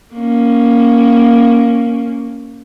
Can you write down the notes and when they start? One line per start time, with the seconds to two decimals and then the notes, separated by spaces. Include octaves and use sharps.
0.14 A#3 C#4